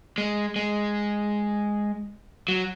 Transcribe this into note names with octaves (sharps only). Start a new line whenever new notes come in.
G#3
G#3
F#3